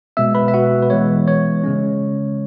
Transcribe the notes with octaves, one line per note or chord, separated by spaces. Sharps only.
B2 G#3 B3 E5 E6
B4 B5
E5
F#4 F#5
B4
E3 G#3 B3 C#5
C#5
C#3 G#3 C#4